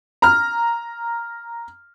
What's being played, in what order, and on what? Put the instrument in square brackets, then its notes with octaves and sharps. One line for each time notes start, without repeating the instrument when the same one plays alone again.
[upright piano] A#5 F6